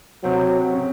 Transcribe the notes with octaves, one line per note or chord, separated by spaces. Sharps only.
C3 F#3 C4
C#3 C#4